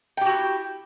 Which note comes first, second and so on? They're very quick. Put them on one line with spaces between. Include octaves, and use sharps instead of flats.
G5 G4 F#4 E4